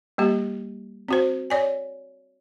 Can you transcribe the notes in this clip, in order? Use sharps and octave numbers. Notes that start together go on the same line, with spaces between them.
G3 A#3 G4
C4 F#4 C5
C#5 D5 G#5